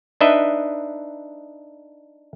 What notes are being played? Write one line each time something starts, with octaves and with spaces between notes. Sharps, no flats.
D4 D#4 B4 D#5 E5